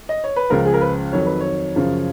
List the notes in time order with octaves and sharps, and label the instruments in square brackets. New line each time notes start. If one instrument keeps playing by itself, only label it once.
[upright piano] D#5
C#5
B4
C#2 C#3 F3 A#4
G#4
A#4
B4
F2 D#3 F#3 C#5
B4
C#5
F#2 C#3 F3